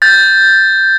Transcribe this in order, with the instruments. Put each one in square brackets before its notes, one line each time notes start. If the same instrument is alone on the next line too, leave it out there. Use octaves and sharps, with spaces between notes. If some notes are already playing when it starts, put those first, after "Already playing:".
[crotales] G6 A6